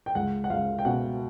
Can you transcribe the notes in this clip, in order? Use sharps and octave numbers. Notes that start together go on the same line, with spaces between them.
G5
C#2 F#5
F#5
C#2 F5
G5
B2 F#5